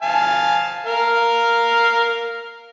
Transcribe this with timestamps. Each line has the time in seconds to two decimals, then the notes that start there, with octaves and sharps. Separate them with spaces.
0.02 F5 G#5 A5
0.86 A#4 F5